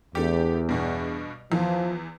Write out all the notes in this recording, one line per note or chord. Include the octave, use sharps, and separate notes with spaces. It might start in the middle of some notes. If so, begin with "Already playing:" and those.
E2 A3 D4 G4
G2 B2
E2 E3 F3